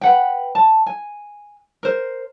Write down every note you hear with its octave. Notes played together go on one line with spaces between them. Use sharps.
B4 F#5 G5
A5
G#5
A#4 C5